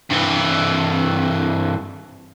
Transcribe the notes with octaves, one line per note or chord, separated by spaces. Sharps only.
G2 E3